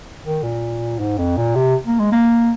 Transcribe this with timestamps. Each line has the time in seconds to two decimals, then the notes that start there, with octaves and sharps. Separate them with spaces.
0.25 D#3
0.43 A#2
1.00 G#2
1.18 F2
1.38 A#2
1.56 C3
1.86 A#3
2.00 G#3
2.12 A#3